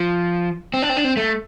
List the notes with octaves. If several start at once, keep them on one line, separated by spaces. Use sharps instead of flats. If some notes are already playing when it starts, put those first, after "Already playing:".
Already playing: F3
C4
D4
C4
D4
C4
A3